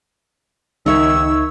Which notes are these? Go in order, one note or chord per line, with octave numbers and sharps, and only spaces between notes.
C#2 D#3 D#4 E5 C#6 E6 G#6